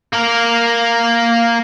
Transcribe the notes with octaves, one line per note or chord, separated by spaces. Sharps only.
A#3 A#4